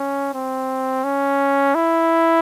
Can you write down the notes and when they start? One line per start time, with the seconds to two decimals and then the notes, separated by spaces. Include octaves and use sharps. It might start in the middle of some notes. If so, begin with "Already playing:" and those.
Already playing: C#4
0.34 C4
1.04 C#4
1.75 E4